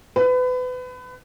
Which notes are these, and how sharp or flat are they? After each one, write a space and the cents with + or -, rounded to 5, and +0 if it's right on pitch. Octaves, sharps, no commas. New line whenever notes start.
B4 +30